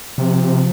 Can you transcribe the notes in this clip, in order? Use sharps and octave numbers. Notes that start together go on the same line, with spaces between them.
C3 F3